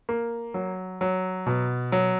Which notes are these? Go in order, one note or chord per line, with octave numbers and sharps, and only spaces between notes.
A#3
F#3
F#3
B2
F#3